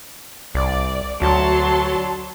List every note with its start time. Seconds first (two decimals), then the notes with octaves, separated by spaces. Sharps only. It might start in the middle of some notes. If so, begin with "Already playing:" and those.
0.55 C2 D5
1.22 D2 F#3 A5 C6